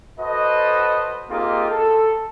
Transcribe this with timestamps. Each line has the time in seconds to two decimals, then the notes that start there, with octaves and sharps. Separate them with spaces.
0.19 F#4 A4 B4 C5 D#5
1.30 A#3 C4 D#4 F4 G4 G#4
1.70 A4